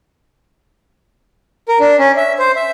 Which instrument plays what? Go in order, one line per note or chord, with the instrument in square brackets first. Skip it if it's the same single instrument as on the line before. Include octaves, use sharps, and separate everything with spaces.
[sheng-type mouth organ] A#4
D4
C#4
E5
C5
E5